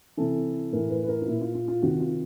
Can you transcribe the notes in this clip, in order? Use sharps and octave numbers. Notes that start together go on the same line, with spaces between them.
C3 E3 A4
A2 E3 A#4
B4
B4
A#4
F4
A#2 E4
F4
F4
F4
C3 D#3 F#4
F4